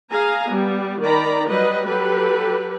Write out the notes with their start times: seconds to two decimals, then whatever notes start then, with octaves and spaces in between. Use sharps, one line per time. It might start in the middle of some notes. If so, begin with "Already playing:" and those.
0.10 G#4 F5 G#5 A#5
0.48 G3 B3
1.01 D#3 D5 A#5 B5
1.47 F#3 G3 B4 D#5
1.86 F#3 G4 A4 B4